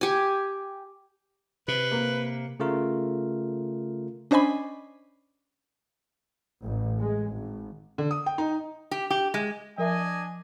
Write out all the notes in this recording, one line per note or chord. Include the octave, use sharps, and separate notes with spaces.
G4 G#5
C3 B4
A#3
C#3 A3 F4 A#4
C#4 D4 C5 D#5 G#5 B5
A1
G#3
G#1
D3
D#6
G5
D#4
G4
G4
G#3
F3 D4 A#4 D#5 E5 G#5